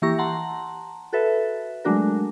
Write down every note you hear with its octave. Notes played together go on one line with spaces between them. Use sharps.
E3 A#3 E4 G4 C#6 A#6
F#5 A5 A#5 C6
F#4 A4 B4 E5
F#3 G#3 A3 D4 F#4 A#4